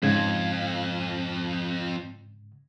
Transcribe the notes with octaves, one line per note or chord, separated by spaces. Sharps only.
F2 G#2 C#3 G#6